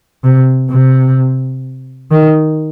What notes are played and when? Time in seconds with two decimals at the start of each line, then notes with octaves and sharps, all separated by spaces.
0.24 C3
0.70 C3
2.11 D#3